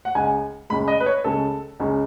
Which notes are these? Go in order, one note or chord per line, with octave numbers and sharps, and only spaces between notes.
F#5
C#2 C#3 G#3 G#5
C#2 C#3 G#3 B5
D#5
B4
C#5
C#2 C#3 G#3 A4
C#2 C#3 G#3